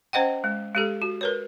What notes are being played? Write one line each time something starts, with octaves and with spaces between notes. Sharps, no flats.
C#4 C5 D#5 F#5 G5
G#3
G#3 G4 A4
F#4
A#4 B4 C#5